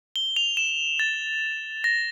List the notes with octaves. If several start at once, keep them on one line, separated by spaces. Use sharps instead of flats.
G7
F7
E7
A6
A#6